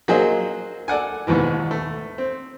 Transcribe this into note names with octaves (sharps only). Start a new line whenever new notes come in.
F#3 A#3 F#4 G#4 C5 D#5
A4 D5 F#5 G#5
D#2 G#2 B2 E3
A3
C4